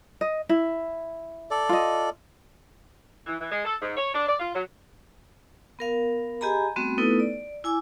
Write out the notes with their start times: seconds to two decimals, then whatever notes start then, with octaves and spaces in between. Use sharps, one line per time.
0.21 D#5
0.49 E4
1.51 A4 D5
1.69 F4 D#5
3.26 E3
3.40 E3
3.51 G#3
3.65 A4
3.81 G#2
3.97 C#5
4.13 D4
4.27 D5
4.40 F4
4.54 F#3
5.79 B3 A#4 F5
6.41 G4 G#4 D#5 G#5 A#5 B5
6.76 G3 A3 B3 C4 F#4
6.98 A3 B3 D#4 E4 A4 B4
7.20 D5
7.64 E4 G#5 D6 E6